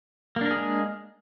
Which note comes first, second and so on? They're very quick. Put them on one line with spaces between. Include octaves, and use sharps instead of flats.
A#3 D4 A#4 G#4 G#3